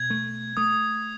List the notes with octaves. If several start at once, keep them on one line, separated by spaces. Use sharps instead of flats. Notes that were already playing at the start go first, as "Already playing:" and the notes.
Already playing: B2 G#6
A3
A3 D#6